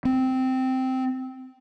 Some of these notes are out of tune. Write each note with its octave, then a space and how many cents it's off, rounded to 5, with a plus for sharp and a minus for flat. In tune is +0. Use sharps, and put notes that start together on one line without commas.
C4 -10